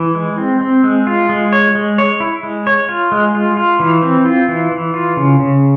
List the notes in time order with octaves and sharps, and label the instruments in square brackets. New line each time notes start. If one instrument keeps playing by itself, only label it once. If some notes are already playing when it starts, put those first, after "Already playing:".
Already playing: [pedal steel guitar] E3
G#3
C4
C4
G#3
F4
G#3
C#5
G#3
C#5
E4
G#3
C#5
F4
G#3
F4
F4
E3
C4
F4
E3
E3
F4
C#3
C#3